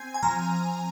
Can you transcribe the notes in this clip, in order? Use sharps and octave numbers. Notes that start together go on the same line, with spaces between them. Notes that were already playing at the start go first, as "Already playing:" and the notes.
Already playing: C4 G#5
G#5
F3 A#5